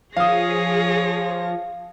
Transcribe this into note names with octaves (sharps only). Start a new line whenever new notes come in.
F3 G#4 C#5 F5 D#6 A#6